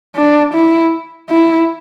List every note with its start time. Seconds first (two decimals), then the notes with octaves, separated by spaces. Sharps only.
0.16 D4
0.54 E4
1.30 E4